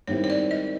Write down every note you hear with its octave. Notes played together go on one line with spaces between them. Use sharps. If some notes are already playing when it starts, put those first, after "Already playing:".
G#2 D#3 G3 C4 E4 C#5
C#5
D5
D#5